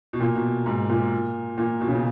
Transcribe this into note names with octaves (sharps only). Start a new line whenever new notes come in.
B2
A#2
B2
G#2
A#2
A#2
B2
C#3
B2